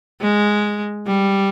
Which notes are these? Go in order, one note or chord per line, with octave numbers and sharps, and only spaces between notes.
G#3
G3